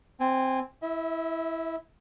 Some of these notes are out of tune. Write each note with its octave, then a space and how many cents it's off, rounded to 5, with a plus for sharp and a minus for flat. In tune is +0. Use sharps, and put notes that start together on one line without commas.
C4 +0 G#5 -20
E4 +0 E5 -40